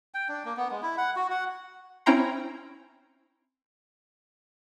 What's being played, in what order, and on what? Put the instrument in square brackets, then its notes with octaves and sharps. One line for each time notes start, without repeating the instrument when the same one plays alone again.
[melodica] G5
D4
A#3
B3
G#3
E4
F#5
F#4
F#5
[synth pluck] C4 C#4 E4 G5 A#5 C6